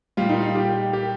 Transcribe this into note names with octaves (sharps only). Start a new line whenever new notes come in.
A#2 G3 F4
D#4
F4
G4
G4